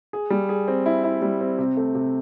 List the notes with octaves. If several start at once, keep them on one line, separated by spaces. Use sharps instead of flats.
G#4
G3
G#4
C4
E4
E4
G3
C4
C3
A3
C3